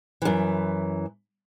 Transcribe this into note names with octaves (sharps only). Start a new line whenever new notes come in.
F#2 E3